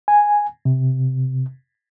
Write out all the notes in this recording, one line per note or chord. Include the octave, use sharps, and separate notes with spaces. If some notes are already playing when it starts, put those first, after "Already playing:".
G#5
C3